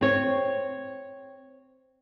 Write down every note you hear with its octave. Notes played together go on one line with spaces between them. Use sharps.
C4 C#5